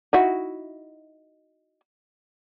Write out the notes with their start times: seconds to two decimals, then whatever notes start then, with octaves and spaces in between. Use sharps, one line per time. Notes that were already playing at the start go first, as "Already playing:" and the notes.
0.13 D#4 E4 F#4